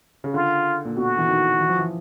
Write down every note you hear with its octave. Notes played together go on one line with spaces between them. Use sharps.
C#3
D3 F4
A#2
B2 F#4
E3
D#3
E3
F3
E3